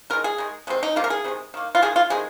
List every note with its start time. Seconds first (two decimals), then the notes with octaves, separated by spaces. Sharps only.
0.10 D#3 A#4
0.13 G#3
0.24 G#4
0.38 D#3 G#3
0.67 C3 D#3 G#3 C4
0.83 D#4
0.96 C3 D#3 A#3 F4
1.04 A#4
1.10 G#4
1.24 C3 D#3 G#3
1.54 D#3 A#3
1.75 F4
1.82 D#3 G#3 G#4
1.96 F4
2.10 C3 D#3 G#3 G#4